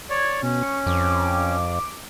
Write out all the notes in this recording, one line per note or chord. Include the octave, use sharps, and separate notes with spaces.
C#5 D5 G#6
B2 C#4
C#6
F2 D6